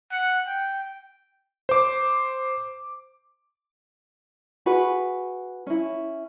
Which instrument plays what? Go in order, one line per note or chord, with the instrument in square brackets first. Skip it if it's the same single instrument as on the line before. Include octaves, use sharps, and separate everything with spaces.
[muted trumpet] F#5
G5
[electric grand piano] C5 D6
[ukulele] F#4 G#4 B4
C#4 E4